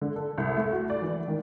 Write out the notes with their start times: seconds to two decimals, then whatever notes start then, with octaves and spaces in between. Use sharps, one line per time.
0.01 D3
0.16 A4
0.38 C2
0.57 A3
0.72 F#4
0.90 D5
1.02 E3
1.28 D#3